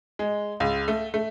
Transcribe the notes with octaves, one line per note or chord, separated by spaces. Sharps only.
G#3
C#2
A3
A3